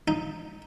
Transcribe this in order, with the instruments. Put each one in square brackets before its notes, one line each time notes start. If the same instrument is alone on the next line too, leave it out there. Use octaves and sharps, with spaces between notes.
[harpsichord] D#4